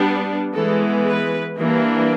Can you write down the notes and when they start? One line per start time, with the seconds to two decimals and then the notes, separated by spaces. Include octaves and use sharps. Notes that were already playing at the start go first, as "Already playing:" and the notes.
Already playing: G3 B3 D4
0.55 E3 G#3 B3 A4
1.07 B4
1.58 E3 G3 A#3 D4